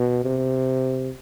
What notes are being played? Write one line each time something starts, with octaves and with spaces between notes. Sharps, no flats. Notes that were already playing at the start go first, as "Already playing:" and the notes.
Already playing: B2
C3